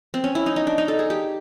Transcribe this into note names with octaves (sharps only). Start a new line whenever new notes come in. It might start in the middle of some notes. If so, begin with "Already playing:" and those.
C4
C#4
E4
D#4
D#4
D4
D#4
A4
G#4
G4